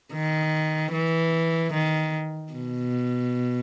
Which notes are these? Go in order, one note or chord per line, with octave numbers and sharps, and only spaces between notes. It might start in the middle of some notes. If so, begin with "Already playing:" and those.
D#3
E3
D#3
B2